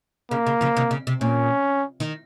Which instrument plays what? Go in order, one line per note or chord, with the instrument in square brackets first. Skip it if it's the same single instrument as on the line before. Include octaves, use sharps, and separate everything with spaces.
[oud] C#3 [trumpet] A#3
[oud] C#3
C#3 F3
C3 D#3
C#3
C3
[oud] A#2 [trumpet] C#4
[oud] D#3